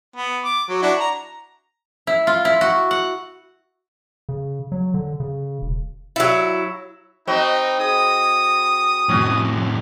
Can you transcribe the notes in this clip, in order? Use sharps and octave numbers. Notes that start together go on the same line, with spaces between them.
B3
D6
F#3
D4 E4 F#4
A#5
E4
F4
E4
F#4
F#5
C#3
F#3
D3
C#3
E1
F#3 E4
C4 D#4 F#4 D#5 B5
G#4 D#6
F2 A2 C#4 F#4